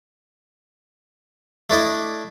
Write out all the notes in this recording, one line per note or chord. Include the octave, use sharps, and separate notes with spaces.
A3 D4 E4 D#5